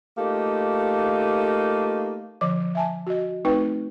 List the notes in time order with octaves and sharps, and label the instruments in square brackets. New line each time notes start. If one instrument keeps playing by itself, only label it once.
[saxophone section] A3 A#3 D#4 F4 G4
[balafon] D3 F3 C#5 D6
E5 G#5 A5
F#4 D#5
A3 C4 D#4 B4 G5